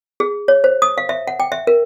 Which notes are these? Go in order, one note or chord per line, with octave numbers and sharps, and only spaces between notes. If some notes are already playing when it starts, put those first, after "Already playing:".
G#4
C#5
C5
D#6
F5
E5
F#5
G5
E5
A#4